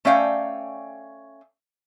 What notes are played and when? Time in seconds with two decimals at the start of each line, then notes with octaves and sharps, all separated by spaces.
0.05 A3 C#4 D5 F5 G5